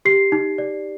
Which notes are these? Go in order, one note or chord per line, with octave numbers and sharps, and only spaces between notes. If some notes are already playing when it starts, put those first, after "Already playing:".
G4 C7
D#4
D5